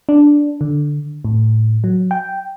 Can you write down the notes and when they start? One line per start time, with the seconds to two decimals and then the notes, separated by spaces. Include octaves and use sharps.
0.09 D4
0.61 D3
1.25 A2
1.84 F#3
2.11 G5